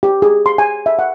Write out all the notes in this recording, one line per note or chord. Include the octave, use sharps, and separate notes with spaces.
G4
G#4
C6
G#5
E5
F#5